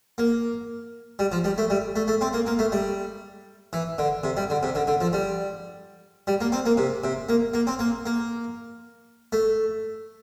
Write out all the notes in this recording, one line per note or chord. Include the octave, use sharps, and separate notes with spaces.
A#3
G3
F3
G3
A3
G3
A3
A3
C4
A#3
A#3
A3
G3
E3
D3
C3
G3
D3
C3
D3
D3
F3
G3
G3
A#3
C4
A#3
C3
C3
A#3
A#3
C4
A#3
A#3
A3